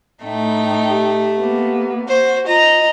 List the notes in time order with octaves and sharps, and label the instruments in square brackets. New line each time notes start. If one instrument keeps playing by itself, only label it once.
[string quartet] A2 D#4 G5 [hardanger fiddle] A3
[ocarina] G4
[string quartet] A#3 B3
[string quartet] F#4 [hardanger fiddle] C5
[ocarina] F4 [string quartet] D#5 [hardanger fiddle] A#5